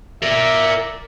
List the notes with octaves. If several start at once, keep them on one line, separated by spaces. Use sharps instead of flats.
A#4 D5 E5